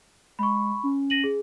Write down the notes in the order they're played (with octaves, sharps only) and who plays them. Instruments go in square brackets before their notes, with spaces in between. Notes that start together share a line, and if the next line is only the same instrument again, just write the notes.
[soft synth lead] G#3 [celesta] B5 C#6
[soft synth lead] C#4
[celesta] A#6 D#7 F#7
G#4